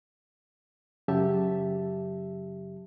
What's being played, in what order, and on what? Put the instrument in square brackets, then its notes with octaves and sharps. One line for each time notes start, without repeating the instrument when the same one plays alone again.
[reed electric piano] F#2 C#3 F#3 G4 E5 A5